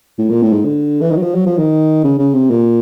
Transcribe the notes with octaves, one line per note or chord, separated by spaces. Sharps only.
A2
A#2
A2
G#2
D3
E3
D#3
F#3
F3
F#3
F3
D#3
C#3
C#3
C3
A#2